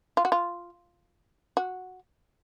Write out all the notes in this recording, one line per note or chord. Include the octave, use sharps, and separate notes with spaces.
F4
F#4
F4
F#4